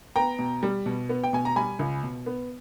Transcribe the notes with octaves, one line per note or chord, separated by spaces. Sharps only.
B3 G5 A#5
B2
G3
B2
B3
G5
B2 G#5
A#5
G3 G#5 B5
C#2
B2
B3